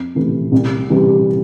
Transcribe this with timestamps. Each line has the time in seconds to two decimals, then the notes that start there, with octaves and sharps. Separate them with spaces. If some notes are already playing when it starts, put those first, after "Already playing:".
Already playing: F2
0.15 C3 E3 A3
0.52 C2
0.90 C3 E3 G3